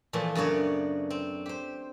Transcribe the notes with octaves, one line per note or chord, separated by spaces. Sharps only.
A#2 E3 F3 A3
F#2 C#3 B3 D4 C#5
C4
G4 C5